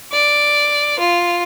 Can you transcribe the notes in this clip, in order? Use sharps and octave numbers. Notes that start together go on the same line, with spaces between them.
D5
F4